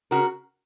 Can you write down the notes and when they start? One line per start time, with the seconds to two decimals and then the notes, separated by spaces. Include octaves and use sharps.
0.11 C#3 F#4 A#4